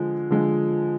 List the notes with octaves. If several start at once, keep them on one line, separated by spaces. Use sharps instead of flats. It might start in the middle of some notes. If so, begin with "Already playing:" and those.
Already playing: D3 F3 G#3
D3 F3 G#3